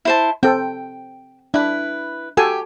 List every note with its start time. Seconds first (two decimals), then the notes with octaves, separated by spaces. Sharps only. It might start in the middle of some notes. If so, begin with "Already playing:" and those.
0.05 E4 C5 A5
0.43 C4 A4 G5
1.54 D4 E4 B4
2.37 F#4 G4 A4 G#5